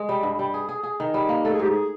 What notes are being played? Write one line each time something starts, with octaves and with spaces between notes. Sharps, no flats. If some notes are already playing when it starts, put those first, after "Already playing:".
Already playing: G#3
G3
G2
G3
G#4
G#4
G#4
D#3
G3
A#3
A3 A4
G#4
G#2 G4
G#4